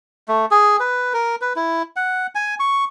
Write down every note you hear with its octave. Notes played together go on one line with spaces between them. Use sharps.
A3
G#4
B4
A#4
B4
E4
F#5
G#5
C#6